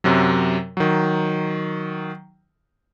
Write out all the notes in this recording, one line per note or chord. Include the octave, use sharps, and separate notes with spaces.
F#2 C3 F#3
D#3 F#3